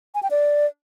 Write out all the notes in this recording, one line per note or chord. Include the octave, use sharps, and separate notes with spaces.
G#5
G5
D5